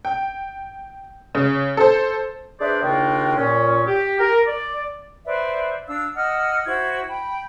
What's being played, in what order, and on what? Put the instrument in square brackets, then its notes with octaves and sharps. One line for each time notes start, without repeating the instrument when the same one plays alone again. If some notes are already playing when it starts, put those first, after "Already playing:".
[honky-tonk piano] G5
C#3
A4 C5
[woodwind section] D4 G#4 B4 C5 D5 E5
D#2 C#3 D4 F4 F#4 G5
A#2 C#4
G4
A#4
D5
[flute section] B4 C5 D5 E5
D4 F5 E6
D#5 F#5 E6 F6
E4 F#4 C5 G#6
G5 B5